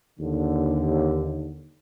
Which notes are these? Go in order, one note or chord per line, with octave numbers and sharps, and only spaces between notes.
D#2 D3